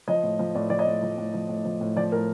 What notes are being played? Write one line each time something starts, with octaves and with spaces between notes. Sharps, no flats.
F3 D#5
A2
F3
A2 D5
F3 D5
D#5
A2
F3
A2
F3
A2
F3
A2
F3 D5
A2 A#4